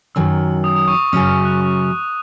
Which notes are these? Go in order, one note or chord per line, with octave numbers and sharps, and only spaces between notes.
F#2 D#3 F#3 E6
D#6
D#6
C#6
D#6
F#2 C#3 F#3 C#4 D#6
E6
F#6
C#6